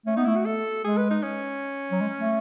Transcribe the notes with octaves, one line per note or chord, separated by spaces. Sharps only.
A3 C#4
B3 D#4
A3 E4
F#4
A4
G#3 G#4
B4
D#4
C#4
F#3
G#3
A3